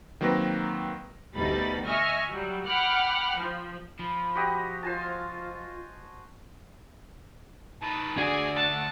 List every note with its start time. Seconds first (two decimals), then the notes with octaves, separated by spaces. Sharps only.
0.21 D#3 F#3 A#3 C4 B4 A#6
1.35 D2 B2 G3 D#4 B5 A6
1.85 D#5 E5 G#5 C#6 F6
2.29 F#3 G3
2.65 F#5 G5 B5 D6 F6 F#6
3.37 F3
3.99 F3 B5
4.35 F#4 G4 D#5
4.83 F4 C5 G#5 A5
7.82 D#3 B4 A5
8.18 D2 D4 F#4 G#4 D5 G#5
8.57 F#5 A5